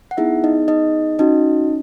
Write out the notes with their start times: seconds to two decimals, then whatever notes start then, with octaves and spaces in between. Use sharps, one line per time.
0.11 F#5
0.17 B3 D#4 E4 G#4 E5
0.44 D#4 D#5
0.68 D#4 D#5
1.19 C#4 D#4 F#4 D#5